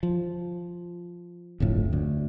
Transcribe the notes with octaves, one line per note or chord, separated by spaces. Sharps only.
F3
D1 G1 F2 A2
D2